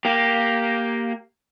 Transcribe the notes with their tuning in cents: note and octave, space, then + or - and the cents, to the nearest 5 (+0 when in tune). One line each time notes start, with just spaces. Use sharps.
A#3 +0 G4 +0